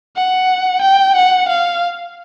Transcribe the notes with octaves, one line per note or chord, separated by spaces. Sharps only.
F#5
G5
F#5
F5